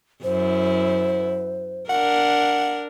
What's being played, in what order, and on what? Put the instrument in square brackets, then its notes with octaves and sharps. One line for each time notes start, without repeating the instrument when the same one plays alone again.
[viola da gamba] F#2 E4 [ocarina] C5
[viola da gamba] D4 A#4 [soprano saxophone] F#5